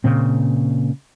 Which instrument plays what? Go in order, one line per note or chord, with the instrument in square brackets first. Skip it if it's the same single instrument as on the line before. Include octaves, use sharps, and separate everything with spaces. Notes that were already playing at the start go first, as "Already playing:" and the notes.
[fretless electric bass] A#2 C#3 C4